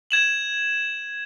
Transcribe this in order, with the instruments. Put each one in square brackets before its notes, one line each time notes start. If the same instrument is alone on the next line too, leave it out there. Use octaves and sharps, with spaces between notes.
[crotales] G#6 E7 F#7